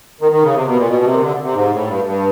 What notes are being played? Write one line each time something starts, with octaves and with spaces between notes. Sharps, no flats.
D#3
D#3
C#3
C3
B2
A#2
B2
C3
D#3
D3
C3
G#2
A2
G2
G2